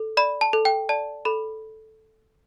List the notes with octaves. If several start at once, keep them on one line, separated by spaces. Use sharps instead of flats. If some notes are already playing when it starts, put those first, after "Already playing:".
Already playing: A4
D5 B5
A5
A4
G5
D5 A5
A4 B5